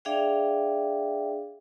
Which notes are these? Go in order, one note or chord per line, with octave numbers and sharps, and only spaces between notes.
D4 G#4 D5 E5 F5 G5